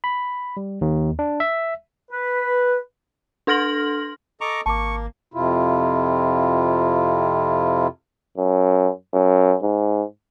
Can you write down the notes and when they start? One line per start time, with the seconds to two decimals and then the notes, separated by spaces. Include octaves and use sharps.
0.04 B5
0.57 G3
0.81 D#2
1.19 D4
1.40 E5
2.11 B4
3.47 D4 A4 C6 F6 A#6 F#7
4.41 A4 D#5 A#5 C#6 D6
4.66 G#1 A#3 A5 C#6 D6
5.34 F2 C3 E4 F4
8.38 F#2
9.13 F#2
9.62 G#2